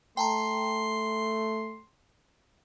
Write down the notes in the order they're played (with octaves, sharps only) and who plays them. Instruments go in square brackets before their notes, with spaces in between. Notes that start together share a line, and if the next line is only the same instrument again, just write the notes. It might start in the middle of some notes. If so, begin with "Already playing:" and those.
[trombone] A3 [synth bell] G5 A5 A#5 [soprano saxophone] C6